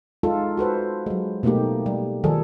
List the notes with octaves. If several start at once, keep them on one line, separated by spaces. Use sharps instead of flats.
G#3 D#4 F4 A4
F#4 A4 B4 C5
F#3 G#3
B2 A3 A#3 D#4 G4
G3
D#3 F3 G3 G#4 A4